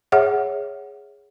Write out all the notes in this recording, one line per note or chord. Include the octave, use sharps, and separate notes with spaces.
G#4 C#5 E5 F#5